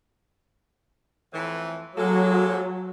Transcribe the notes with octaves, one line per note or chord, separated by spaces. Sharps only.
F2 A2 E3
F#3 G#3 A#3 A4